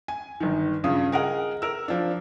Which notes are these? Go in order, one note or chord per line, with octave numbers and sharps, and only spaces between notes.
G#5
G1 D#3
G2 C#3 F4 D#6
G#4 A#4 D#5 F#5
A#4 E6
F3 D4